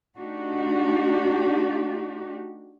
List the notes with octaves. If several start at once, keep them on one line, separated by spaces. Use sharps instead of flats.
A3 D4 D#4 F#4 G4